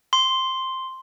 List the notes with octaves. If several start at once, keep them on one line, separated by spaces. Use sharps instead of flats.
C6